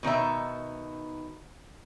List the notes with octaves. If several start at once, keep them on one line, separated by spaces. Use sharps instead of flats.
B2 D#3 D#4 E5